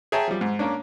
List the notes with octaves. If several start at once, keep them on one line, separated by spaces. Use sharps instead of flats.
G#4 C#5 E5 G5 A5 A#5
F3 G3
G#2
A#3 C#4 D4